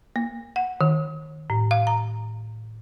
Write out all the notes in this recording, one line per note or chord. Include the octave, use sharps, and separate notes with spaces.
A#3
F#5
D#3
A2
F5
A#5